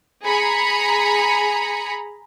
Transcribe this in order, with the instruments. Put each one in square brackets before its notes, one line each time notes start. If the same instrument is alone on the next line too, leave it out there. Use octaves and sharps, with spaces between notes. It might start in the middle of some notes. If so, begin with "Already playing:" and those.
[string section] G#4 A#5 B5 C#7